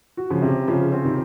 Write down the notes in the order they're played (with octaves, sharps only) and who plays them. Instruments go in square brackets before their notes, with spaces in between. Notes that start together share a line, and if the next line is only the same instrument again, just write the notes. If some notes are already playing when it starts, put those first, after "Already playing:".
[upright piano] F#4
[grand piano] C#3 F3
[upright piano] C3
[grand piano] C#3 [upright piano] F3
[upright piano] C4
[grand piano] C3 D#3